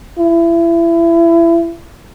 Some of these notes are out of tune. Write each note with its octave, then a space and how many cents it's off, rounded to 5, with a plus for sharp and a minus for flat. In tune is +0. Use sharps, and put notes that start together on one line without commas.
E4 +30